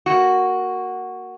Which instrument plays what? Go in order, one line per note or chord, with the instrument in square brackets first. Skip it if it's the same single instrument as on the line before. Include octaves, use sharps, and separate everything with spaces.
[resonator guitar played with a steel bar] A#3 F#4